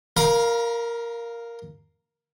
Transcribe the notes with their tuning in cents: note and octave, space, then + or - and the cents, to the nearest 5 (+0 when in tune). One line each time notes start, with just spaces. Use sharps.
A#4 +0 F5 +0 A#5 +45